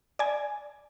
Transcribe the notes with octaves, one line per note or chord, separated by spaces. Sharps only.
D5 G#5